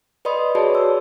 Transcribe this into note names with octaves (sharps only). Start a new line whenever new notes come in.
B4 D5 D#5 B5 C6 D#6
F#4 G#4 B4 C#5 D5 A5
E6